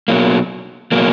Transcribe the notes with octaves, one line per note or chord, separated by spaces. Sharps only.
B2 F#3 A#3
B2 F#3 A#3